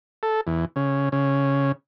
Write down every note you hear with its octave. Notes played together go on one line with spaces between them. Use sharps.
A4
E2
C#3
C#3